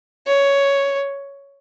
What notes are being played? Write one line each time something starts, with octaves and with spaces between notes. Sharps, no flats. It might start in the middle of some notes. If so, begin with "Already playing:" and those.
C#5